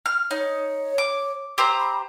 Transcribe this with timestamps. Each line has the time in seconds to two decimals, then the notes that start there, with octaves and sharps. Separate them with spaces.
0.06 F6
0.31 D#4 C#5
0.98 D6
1.58 G4 C5 A#5 E6
1.79 B5